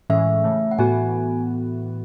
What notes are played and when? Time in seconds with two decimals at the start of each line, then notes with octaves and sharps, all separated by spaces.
0.10 A2 E3 G#3 C#4 E5
0.44 C#3 E3 A3
0.71 F#5
0.79 A2 E3 B3 F#4 G#5